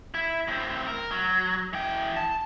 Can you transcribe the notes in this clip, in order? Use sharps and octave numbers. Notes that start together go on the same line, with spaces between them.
E4
A2 C4
A#4
F#3
E3 G5
A5